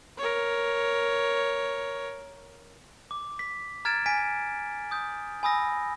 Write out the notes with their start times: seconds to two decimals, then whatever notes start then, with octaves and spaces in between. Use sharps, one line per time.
0.18 A#4 C#5
3.11 D6
3.39 B6
3.85 A#5 F6 G#6 A6 D7 E7
4.06 G#5 B6 D7
4.91 D#6 G6
5.43 G#5 B5 D#6 E6 A#6